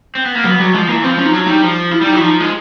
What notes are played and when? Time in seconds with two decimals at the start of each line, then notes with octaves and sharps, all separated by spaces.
0.15 C4
0.25 B3
0.35 A#3
0.45 F#3 B3
0.60 F#3 G3
0.74 F3 G#3
0.89 E3 A#3
1.04 F3 C4
1.19 C#4
1.26 D#4
1.33 F#3 D4
1.47 G3 D#4
1.63 F3
1.92 E4
2.01 G3
2.07 D#4
2.12 F#3
2.16 E4
2.21 F3 D#4
2.40 G#3